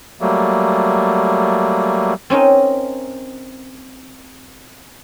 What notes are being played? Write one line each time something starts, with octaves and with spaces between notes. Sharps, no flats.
F#3 G3 A3 A#3
C4 C#4 D#4 A#4